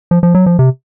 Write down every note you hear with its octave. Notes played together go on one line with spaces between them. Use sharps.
F3
F3
F#3
F3
C3